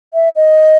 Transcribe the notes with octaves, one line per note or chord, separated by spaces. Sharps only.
E5
D#5